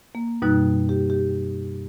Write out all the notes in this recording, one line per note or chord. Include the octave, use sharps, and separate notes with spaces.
A#3
F#2 B2 G3 D#4 F#6
G4
G4